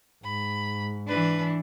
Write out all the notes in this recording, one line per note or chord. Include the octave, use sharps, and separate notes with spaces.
G#2 B5
E3 D4 B4